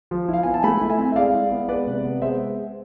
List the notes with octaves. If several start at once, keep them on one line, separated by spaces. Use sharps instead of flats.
F3
E4 F5
B3 G#5
A5
A3 G#5 B5
E4
E5 G#5
C4
E5
G#3 D5 F5
E4
B3
G#3 B4 D5
C3
B3
G#3 C5 E5